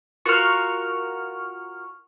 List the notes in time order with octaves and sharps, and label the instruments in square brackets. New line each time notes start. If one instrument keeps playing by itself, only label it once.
[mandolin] F4 F#4 A#4 [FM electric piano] C#6 F6